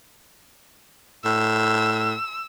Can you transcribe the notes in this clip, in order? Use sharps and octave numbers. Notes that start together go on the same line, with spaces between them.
A2 E6